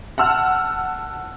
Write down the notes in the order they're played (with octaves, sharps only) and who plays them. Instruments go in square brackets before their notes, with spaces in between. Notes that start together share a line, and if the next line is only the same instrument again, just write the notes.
[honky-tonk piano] F#5 A5 E6 F6